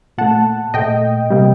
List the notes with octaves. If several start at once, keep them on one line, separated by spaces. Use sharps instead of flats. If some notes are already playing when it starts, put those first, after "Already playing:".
A#2 A3 F#5 A5
A#2 A3 D#5 G5
C3 G3 A#3